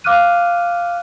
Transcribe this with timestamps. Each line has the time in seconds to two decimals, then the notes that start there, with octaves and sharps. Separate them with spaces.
0.04 F5 D6 F6 F#6 D#7